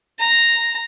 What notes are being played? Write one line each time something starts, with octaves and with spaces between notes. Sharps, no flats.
A#5